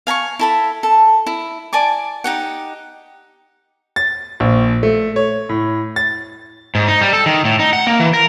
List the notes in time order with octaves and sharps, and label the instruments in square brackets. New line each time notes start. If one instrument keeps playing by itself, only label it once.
[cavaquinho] F5 G#5 A#5 C#6
E4 A4 B5
A4
E4
D5 G#5 A5 D6
D#4 G4 F#5
[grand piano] A6
A#1
A3
C#5
A2
A6
[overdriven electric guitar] G#2
D#4
G3
A4
D#3
A2
D#4
F#5
A#3
E3
A#4